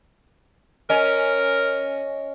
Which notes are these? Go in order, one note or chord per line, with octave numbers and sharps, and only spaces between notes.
C#4 A#4 D#5